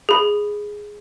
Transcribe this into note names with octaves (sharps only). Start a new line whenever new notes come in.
G#4 B5